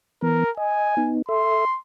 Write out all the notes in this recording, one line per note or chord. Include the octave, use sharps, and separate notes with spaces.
E3 B3 A#4
D#5 G#5
B3 D#4
A4 E5 C6